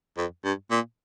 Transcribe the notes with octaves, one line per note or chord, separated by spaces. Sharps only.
F2
G2
A#2